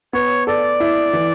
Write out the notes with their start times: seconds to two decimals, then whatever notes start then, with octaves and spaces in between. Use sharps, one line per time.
0.13 B3 C#5
0.47 A4 D5
0.80 E4
1.13 E3